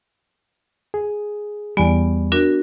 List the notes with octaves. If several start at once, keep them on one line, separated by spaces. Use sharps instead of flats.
G#4
E2 G3 B3 D5 G#5
D4 F#4 A#4